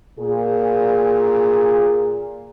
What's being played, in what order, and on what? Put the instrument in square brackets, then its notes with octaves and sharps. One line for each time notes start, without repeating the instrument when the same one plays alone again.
[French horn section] A#2 G#4